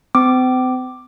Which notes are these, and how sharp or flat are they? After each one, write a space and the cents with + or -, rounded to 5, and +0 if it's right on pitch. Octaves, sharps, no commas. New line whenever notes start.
C4 -40 D6 +5